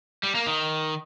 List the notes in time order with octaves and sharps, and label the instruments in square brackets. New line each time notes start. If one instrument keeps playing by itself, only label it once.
[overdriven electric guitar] G3
A#3
D#3